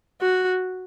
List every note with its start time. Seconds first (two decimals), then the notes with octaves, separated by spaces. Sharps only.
0.21 F#4